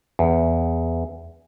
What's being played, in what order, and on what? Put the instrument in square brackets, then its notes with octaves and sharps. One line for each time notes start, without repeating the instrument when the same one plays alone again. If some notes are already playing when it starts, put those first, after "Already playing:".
[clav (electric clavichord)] E2